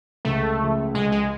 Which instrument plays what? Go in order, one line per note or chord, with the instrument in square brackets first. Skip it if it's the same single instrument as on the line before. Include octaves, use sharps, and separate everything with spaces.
[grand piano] C#2 [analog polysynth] A3
[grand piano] C#3 F3
[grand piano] C#2 [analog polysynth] G#3
[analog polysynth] G#3